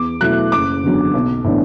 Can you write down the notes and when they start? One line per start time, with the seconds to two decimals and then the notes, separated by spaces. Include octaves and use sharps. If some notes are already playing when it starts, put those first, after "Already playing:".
Already playing: E2 D6
0.20 B2 F#3 A3 E4 F#6
0.52 F#1 D6
0.83 E2 D3 F#3
1.14 B1
1.44 A2 E3 B3 D4